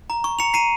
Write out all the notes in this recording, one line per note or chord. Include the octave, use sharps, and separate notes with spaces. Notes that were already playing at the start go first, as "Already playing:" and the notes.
A#5
C#6
A#5 C#7 F7
A#5 C7 D#7